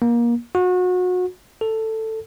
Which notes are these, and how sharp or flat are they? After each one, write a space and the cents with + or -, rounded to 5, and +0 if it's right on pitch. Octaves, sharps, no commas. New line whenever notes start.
A#3 +25
F#4 -30
A4 +10